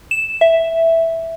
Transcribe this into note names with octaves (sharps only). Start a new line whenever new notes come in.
E7
E5